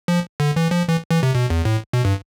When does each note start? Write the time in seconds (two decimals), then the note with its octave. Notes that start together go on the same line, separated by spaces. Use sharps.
0.08 F3
0.40 D3
0.56 E3
0.71 F3
0.88 E3
1.11 E3
1.23 C3
1.35 B2
1.50 E2
1.65 A2
1.93 B2
2.05 G2